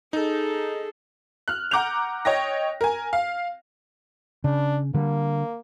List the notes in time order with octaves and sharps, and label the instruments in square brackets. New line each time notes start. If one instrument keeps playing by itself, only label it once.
[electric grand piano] D#4 [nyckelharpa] G#4 A4
[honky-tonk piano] F6 F#6
F#5 A#5 D6 F#6 G6 F7
C#5 D#5 G5 A#6
A#4 G#5
F5
[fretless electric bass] C#3 [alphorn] D4
[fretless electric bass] D3 G3 [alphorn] A#3